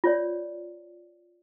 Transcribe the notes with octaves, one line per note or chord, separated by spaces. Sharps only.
F4 C#5 D5